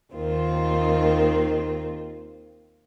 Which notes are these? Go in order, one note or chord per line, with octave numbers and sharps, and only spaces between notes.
D#2 D#3 C4 F4